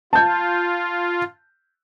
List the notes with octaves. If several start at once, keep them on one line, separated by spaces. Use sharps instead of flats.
F4 A5 G6